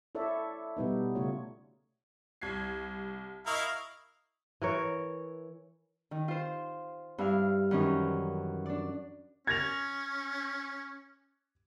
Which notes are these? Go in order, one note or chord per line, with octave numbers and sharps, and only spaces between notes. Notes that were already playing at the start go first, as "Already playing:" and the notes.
E4 A4 C#5 D5 E5
B2 G3 B3 D#4
C#3 A3 F4 C#5
C2 G#6 C7
E4 A#4 D#5 F5 C#6 D#6
E3 A#4 C#5
D#3
F4 C5
G2 E4 F5 F6
F#2 D#3 E3 C#4 D#4
D4 D5
C#4 G#6 A#6 F7